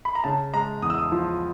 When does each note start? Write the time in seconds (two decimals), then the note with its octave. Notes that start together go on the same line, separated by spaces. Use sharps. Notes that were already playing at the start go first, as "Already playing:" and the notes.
0.05 B5
0.15 A#5
0.24 C#3 A5
0.54 G#3 A#5
0.82 E2 D#6
0.90 E6
0.98 D#6
1.12 F3